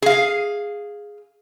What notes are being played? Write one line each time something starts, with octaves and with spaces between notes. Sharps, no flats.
G#4 F5